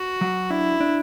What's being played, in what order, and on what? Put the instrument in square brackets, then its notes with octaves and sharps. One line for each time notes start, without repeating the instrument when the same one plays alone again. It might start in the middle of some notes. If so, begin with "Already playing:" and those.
Already playing: [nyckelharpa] F#4
[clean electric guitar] F#3
[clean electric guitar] D4 [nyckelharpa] E4
[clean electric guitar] D4